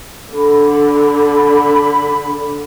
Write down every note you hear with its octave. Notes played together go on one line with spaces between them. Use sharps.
D3 B5